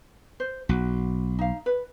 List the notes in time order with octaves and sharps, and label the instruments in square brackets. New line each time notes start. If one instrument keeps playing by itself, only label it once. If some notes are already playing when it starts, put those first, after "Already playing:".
[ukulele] C5
[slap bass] B1 [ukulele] F#4
[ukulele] D#4 F5
B4